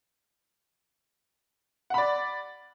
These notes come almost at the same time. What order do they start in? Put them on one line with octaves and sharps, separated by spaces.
F#5 B5 D5